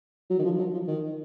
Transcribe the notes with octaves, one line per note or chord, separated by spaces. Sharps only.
F#3
D#3
F3
F#3
F3
D#3